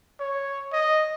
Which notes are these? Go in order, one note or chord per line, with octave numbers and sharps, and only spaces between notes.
C#5
D#5